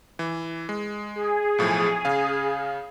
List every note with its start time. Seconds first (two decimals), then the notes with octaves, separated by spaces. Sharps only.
0.19 E3
0.69 G#3
1.16 G#4
1.58 B1 A2 F3
2.05 C#3 F5